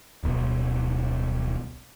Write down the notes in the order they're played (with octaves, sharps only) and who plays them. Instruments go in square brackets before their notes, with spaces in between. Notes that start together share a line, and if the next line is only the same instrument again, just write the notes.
[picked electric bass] D1 B1 B2